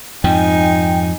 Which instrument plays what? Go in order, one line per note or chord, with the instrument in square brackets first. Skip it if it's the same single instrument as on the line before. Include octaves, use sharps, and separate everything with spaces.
[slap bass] F2 G#2 F3 [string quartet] D#4 G#5 [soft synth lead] G5